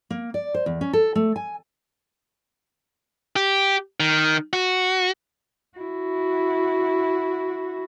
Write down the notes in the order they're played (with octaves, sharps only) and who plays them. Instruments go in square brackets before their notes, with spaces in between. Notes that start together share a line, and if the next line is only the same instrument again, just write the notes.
[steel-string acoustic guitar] A#3
D5
C5
E2
C#4
A4
A3
G#5
[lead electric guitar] G4
D#3
F#4
[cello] E4 F#4